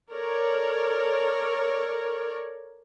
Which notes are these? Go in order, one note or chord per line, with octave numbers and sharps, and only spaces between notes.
A4 A#4 C#5 D5